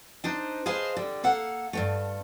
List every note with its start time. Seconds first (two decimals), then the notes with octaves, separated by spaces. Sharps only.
0.24 D4 D#4 C5
0.66 G#4 B4 C5 D#5 F5 A5
0.96 D3 G3
1.23 A#3 A4 F5 F#5
1.73 G2 F#3 A3